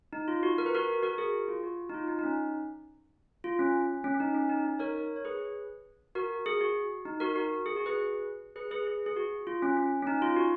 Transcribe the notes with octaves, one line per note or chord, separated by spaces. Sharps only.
D#4
F4
F#4
A#4
B4
F#4 A#4
F#4 A#4
G#4
F4
F#4
D#4
F4
D#4
D#4
C#4
F4
C#4
C#4
C#4
D#4
C#4
D#4
D#4
A#4 C#5
C#5
G#4 B4
F#4 A#4
G#4
F#4
D#4
F#4 A#4
F#4
G#4
F#4
G#4 B4
G#4 B4
G#4 B4
G#4
G#4
F#4
F4
C#4
C#4
C#4
D#4
F4
F#4